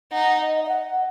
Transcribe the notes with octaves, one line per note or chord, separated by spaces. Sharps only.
D#4 F#5
D#5
D#5
F#5